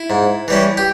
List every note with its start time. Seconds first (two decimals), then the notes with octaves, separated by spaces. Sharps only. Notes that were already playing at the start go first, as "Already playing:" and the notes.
Already playing: E4
0.10 G#2
0.48 E3 G3 C#4
0.77 G4